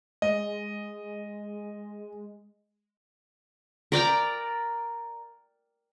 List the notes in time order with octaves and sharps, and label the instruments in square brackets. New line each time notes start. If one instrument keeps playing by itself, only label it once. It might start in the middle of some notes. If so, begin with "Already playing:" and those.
[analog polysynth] G#3 [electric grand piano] D#5
[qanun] A#4 D5 G5 A#5